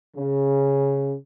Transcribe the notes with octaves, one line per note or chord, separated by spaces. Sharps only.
C#3